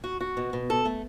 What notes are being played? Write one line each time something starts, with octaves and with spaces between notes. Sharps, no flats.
F#4
F#4
B2
B2
A4
A3